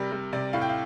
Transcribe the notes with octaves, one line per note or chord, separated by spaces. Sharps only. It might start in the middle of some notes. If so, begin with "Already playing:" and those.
Already playing: C3 G3 A#4
G3
C3 D5
A2 F5
G5
F5